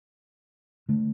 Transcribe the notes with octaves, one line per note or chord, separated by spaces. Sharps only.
D3 A3